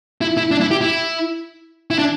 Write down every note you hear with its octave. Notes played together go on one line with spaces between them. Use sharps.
E4
E4
D4
E4
G4
E4
E4
D4